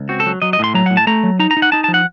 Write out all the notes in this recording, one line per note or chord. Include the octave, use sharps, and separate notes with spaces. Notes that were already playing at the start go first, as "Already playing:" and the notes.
Already playing: C#2
C4 F#4
A4
F#3
F#3 D#5
D#5
A2 C6
F#3 A#5
A2 F#5
A5
A3 A#5
F#3
D#4 A#5
A#5
D#4
F#5
D#4 A5
F3 A5
F#5